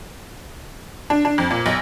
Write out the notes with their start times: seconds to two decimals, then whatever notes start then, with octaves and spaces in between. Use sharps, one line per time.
1.10 D4
1.25 D4
1.38 F2
1.51 A#2
1.66 B1